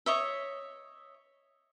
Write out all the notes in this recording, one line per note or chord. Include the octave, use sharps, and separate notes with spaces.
C#5 D#5 E5